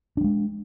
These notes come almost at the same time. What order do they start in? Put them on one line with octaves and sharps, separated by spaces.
D4 G3 G#3